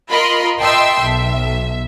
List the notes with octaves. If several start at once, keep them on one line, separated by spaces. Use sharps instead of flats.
F4 A#4 D#5 B5 C6
D#5 E5 G5 A5 C6 E6
B1 E5